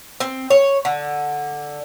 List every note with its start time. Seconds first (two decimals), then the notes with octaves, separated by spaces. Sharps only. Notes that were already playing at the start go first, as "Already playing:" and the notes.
0.20 C4
0.50 C#5
0.85 D3